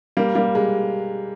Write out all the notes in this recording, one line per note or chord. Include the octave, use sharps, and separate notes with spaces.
G3 A#3
G3 A#3
G#3